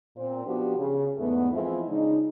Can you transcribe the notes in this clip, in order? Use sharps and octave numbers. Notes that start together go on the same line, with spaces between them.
A#2 C4
F3 B3 D4 F#4 G4
C#3
E2 G#2 A3 B3
E3 F3 G#3 C4 E4 F4
C#3 G#3 D4 D#4